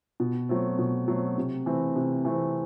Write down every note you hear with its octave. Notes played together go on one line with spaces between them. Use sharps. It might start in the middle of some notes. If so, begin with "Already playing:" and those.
B2
F#3 A3 C4
B2
F#3 A3 C4
C3
E3 A3 C4
C3
E3 A3 C4